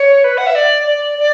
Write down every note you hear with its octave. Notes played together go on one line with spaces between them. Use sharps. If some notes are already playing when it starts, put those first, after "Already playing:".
Already playing: C#5
B4
F#5
E5
D5
D5
D5